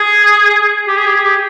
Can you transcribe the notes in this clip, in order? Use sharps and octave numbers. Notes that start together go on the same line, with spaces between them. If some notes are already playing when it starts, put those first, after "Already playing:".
Already playing: G#4
G4
G#4
G4
G#4
G4